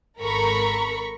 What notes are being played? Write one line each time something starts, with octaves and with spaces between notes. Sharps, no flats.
G#1 A4 A#4 A#5 B5 C#6